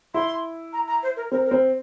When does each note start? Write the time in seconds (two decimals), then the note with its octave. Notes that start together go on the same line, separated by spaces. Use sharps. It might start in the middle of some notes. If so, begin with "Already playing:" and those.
0.14 E4 C6
0.73 A#5
0.88 A#5
1.03 C5
1.17 A#4
1.32 C4 A#4
1.46 A#4
1.51 C4